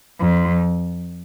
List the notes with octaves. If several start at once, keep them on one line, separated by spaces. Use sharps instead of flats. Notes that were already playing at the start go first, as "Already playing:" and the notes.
F2